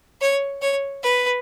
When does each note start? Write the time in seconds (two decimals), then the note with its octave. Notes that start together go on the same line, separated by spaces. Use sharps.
0.21 C#5
0.62 C#5
1.03 B4